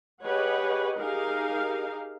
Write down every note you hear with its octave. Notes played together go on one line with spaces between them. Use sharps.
G4 G#4 B4 C#5 D#5 F#5
D#4 G4 G#4 A#4 F5